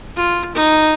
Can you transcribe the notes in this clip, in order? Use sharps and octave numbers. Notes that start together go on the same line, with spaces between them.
F4
D#4